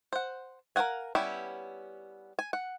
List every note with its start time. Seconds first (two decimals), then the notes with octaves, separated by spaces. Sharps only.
0.13 C5 F#5
0.76 A#4 C5 F5 F#5 G#5
1.15 G3 B3 C#4 E4 G4
2.39 G#5
2.53 F#5